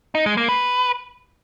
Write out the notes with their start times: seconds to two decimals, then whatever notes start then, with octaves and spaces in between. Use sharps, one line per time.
0.15 D#4
0.26 G#3
0.37 A#3
0.49 B4